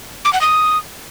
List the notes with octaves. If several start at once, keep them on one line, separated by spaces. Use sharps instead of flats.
D6
F#5
D#6